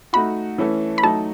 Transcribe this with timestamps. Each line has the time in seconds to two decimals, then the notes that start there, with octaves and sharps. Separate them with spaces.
0.13 A3 D#4 F#4 B5
0.58 E3 A3 C#4 E4 A4
0.98 B5
1.03 F#3 A3 D#4 A5